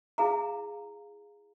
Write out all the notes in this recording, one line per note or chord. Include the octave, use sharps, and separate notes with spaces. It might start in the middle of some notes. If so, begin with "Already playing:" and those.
E4 G#4 F5 A#5